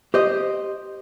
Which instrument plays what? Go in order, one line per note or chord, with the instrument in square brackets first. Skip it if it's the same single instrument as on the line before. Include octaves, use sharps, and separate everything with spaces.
[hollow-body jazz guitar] G4 C5 D#5